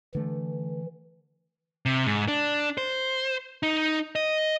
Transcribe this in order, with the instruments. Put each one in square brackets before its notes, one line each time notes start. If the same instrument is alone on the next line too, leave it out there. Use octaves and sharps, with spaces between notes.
[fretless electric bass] D3 A3 [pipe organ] E3
[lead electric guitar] C3
G#2
D4
C5
D#4
D#5